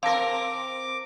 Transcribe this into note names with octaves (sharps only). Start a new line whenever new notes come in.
C4 A#4 F5 A5 D6 A#6